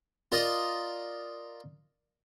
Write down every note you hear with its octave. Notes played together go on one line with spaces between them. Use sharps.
F4 A#4 D5 D#5